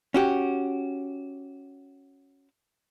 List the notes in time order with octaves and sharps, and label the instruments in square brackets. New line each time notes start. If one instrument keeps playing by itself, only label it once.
[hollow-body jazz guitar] C#4 F#4 G4